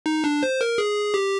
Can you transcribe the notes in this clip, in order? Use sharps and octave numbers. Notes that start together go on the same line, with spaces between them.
D#4
D4
C5
A#4
G#4
G4